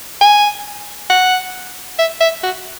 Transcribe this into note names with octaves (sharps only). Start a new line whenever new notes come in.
G#5
F#5
E5
E5
F#4